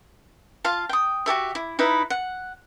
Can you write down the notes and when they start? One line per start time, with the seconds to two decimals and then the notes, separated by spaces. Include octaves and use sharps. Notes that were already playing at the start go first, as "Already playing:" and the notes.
0.64 F4 F5 A5
0.89 G5 D#6
1.26 F#4 G4 A4 E5
1.55 E4
1.79 D#4 E4 B4
2.10 F#5